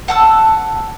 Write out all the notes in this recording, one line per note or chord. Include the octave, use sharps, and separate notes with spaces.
F#5 A5 E6